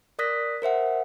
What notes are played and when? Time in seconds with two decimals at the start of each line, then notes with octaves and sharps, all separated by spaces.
0.19 A#4 D5 D#6 F#6 A#6 B6
0.62 A#4 C5 E5 F#5